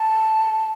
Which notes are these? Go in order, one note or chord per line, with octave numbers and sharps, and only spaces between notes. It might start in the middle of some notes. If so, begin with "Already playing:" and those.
Already playing: A5